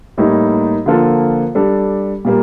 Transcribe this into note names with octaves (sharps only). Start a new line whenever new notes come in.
A2 G3 A#3 D#4
D3 F3 A#3 F4 A4
G3 D4 A4
A#2 G3 A#3